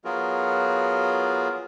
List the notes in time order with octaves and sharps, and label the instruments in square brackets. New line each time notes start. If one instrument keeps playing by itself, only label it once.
[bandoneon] F#3 B3 F4 F#4 G#4 A#4